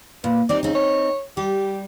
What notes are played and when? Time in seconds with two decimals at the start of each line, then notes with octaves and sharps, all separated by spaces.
0.24 A#2 B4
0.49 C4 D#4 G4 D5
0.63 C#3 C4 D#4
0.75 C#5
1.37 G3 G4